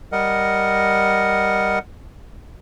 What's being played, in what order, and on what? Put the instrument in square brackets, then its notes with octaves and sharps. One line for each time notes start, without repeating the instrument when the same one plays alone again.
[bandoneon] G3 A#4 D#5 F#5